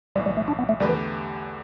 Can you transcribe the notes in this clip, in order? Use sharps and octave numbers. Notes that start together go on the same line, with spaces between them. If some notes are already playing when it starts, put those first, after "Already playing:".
B1 A2 E3 G3
G3
A3
D4
B3
A3
E2 D3 G3 A3 G4 B4
E3